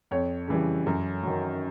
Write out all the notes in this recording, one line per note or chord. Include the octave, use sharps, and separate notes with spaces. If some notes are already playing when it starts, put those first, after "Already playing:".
F2 C#5
C#3 E3 G3
F#2
D#3 F#3